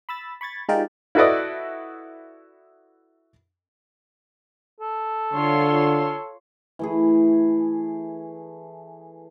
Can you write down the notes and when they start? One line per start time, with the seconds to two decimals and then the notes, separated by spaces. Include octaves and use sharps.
0.09 B5 E6 A6
0.41 B5 C#6 G#6 A6
0.69 G#3 D#4 F4 G4 A#4 D5
1.15 E4 F#4 A4 B4 D5 D#5
4.80 A4
5.33 D3 F4 C#5 C6
6.79 E3 A3 G#4